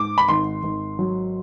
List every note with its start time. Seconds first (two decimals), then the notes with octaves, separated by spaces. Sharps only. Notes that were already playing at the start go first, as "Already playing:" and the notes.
Already playing: G#2 D6
0.18 B5
0.29 G#1 C6
0.63 G#1
0.99 F#3